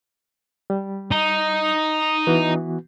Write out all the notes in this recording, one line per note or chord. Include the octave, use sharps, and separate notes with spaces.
G3
D#4
E3 B3 F#4